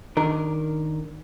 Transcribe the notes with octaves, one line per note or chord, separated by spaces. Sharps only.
D#3 D4 A#4